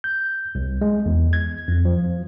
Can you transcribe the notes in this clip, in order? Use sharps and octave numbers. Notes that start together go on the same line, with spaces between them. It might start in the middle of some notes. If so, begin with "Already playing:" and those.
G6
C2
G#3
E2
G#6
F2
F3